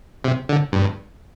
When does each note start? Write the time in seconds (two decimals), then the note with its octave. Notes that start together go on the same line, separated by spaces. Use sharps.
0.24 C3
0.49 D3
0.72 G2